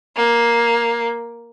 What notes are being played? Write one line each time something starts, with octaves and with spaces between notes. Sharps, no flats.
A#3